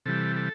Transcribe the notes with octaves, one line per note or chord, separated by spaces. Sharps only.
C3 E3 G3 A4
A4